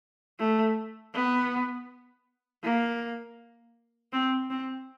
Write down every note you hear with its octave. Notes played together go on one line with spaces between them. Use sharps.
A3
B3
A#3
C4
C4